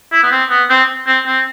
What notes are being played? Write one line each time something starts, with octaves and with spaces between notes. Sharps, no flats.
E4
B3
C4
B3
C4
C4
C4